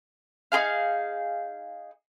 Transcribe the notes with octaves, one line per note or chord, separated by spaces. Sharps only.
D#4 G4 G#4 F5